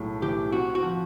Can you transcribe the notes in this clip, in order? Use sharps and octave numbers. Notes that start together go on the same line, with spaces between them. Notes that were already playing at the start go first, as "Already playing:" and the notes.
Already playing: B1 A2 G#3
E3 G4
C4 F#4
F#4
F3